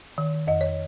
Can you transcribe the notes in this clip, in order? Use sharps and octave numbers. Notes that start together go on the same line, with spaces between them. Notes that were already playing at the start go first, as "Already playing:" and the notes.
D#3
F2 D#5
C#5